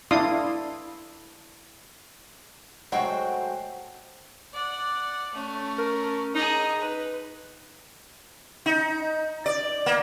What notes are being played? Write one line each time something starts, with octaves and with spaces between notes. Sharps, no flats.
D4 E4 F5 C6 D#6
F#3 G#3 A3 F#4 C5 G5
D5 F#5
A3 C#4
A#4
D#4 G#4 D#5
B4
D#4
D5
A#3